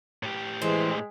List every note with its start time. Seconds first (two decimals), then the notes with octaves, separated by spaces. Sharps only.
0.23 A2 G4
0.62 E3 G#3 C4